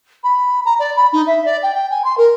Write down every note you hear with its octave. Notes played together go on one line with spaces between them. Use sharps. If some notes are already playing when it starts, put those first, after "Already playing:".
B5
A#5
D5
B5
D#4
E5
D5
G5
G5
G#5
C6
A#4